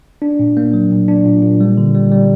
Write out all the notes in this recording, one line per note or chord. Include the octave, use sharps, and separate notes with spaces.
D4
A#2
A#3
F#3
A#2
D4
A#2
A#2
G3
D3
G3
G3